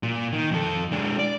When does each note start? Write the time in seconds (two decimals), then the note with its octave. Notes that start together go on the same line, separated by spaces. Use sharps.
0.03 A#2
0.32 D#3
0.51 F2 A4
0.92 G#3 D4
1.19 D5